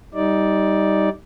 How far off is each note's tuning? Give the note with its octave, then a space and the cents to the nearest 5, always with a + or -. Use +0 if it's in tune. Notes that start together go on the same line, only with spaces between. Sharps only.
G3 +0 D#4 +15 D5 +0